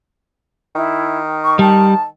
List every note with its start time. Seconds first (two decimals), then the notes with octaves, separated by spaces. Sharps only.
0.75 D#3 E4
1.43 C#6
1.59 G3 A5